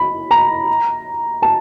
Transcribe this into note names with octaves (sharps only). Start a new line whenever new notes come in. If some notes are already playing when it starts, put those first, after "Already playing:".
Already playing: B5
A#5
A5